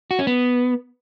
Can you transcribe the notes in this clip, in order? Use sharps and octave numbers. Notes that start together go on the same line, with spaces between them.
F#4
C#4
B3